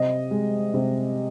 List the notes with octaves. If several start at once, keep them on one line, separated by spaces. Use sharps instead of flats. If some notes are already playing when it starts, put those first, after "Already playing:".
Already playing: C3 D#5
G#3
C3